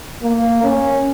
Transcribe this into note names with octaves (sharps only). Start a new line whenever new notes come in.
A#3
C#4